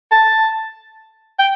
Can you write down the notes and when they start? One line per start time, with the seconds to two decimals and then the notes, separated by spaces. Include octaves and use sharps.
0.12 A5
1.39 G5